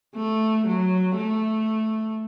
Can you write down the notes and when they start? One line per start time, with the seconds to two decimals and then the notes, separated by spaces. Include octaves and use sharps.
0.16 A3
0.67 F#3
1.17 A3